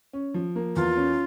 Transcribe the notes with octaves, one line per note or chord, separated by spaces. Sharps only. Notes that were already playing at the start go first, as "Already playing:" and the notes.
C#4
F3
A#3
E2 F4
C#4